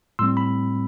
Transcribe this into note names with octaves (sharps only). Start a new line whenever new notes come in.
A2 G3 C4 C6 E6
B5